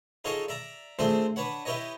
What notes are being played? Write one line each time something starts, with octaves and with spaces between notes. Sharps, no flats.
D#4 F4 G#4 A4 C#5 D#5
D5 E5 A#5
A3 C4 D4 F4 G#4 C5
D4 B4 C#5 F#5
E4 G4 B4 C#5 D#5